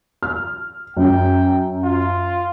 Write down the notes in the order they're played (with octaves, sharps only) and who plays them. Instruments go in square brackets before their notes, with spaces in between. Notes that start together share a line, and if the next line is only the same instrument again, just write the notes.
[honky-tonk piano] F6
[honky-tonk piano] F#2 [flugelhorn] G5
[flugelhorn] F4